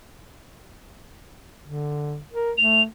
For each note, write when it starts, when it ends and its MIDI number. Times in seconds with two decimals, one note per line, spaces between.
1.64 2.19 50
2.32 2.52 70
2.57 2.85 57
2.57 2.81 101